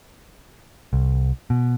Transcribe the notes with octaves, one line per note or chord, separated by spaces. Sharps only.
C2
B2